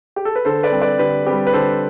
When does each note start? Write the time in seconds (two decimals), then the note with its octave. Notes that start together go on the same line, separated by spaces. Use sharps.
0.16 G4
0.25 A4
0.36 B4
0.45 D3 A4 C5
0.63 B4 D5
0.72 G3 C4
0.82 B4 D5
0.99 D3 G4 B4
1.26 G3 C4 G4 B4
1.47 B4
1.53 D3 A4 C5